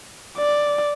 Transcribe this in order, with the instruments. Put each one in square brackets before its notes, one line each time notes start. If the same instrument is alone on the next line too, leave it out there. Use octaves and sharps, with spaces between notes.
[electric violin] D5